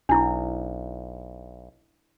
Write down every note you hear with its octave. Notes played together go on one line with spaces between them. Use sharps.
B1 D4 E4